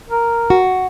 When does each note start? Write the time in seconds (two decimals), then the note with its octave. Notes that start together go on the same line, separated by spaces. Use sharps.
0.09 A#4
0.50 F#4